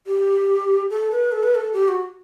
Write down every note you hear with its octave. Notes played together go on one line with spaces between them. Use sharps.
G4
A4
B4
A4
B4
A4
G4
F#4